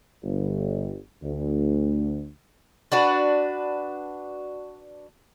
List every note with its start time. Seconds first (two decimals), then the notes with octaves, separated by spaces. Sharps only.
0.23 G1
1.23 D2
2.92 D4 F#4 B4